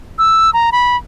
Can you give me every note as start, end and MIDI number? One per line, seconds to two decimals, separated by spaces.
0.18 0.50 88
0.53 0.70 82
0.72 0.96 83